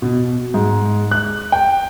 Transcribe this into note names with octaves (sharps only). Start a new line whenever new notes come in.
B2
G#2
F#6
G5